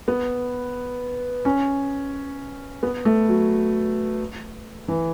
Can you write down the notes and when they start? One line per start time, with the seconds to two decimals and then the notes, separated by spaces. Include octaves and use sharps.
0.08 B3
1.45 C#4
2.83 B3
3.05 A3
3.29 F#3
4.88 E3